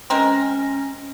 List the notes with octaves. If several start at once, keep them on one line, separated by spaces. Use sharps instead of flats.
G#3 C4 C#4 A#4